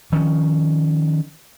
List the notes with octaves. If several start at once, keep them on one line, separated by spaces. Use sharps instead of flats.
D#3 F3 C#4